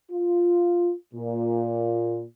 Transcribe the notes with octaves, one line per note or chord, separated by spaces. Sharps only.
F4
A#2